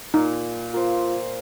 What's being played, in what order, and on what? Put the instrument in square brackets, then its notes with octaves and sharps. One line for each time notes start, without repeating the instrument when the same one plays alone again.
[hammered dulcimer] A#2 [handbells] D#4
[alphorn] F4 [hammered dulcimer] A#4 C5